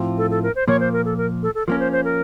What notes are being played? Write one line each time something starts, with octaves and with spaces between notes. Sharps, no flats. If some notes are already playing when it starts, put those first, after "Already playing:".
Already playing: A2 F3 C4 F4
A4
A4
A#4
C5
A#2 F3 A#3 C#5
C5
A#4
A4
A#4
A4
A4
F3 A#3 C#4 A#4
C5
C5
A#4